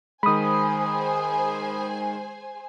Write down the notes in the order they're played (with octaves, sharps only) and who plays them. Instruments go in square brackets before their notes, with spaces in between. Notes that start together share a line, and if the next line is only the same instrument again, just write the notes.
[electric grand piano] D#3 G#3 [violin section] G#4 C5 G#5 [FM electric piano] B5 D#6